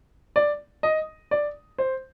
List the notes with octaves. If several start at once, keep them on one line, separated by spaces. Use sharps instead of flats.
D5
D#5
D5
C5